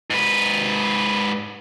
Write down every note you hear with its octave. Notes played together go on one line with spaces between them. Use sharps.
G#2 B4